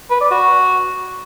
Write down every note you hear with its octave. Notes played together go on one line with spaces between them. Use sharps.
B4
D5
F#4